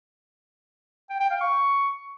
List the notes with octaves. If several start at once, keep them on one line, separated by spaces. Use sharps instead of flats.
G5
G5
F5
C#6